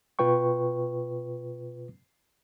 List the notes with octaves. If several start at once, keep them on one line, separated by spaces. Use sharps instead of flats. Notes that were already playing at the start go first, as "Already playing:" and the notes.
B2 F4 B4 G5 C#6